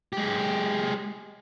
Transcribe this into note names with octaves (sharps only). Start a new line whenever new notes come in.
G#3 G4